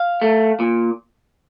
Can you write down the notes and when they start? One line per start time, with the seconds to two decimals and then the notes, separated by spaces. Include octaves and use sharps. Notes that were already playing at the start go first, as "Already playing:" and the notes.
Already playing: F5
0.22 A3
0.60 A#2